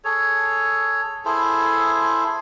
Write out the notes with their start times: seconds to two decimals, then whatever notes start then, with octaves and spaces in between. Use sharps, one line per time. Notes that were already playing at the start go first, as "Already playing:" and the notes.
0.04 G#4 A4 C#5
1.25 E4 G#4 A4 C5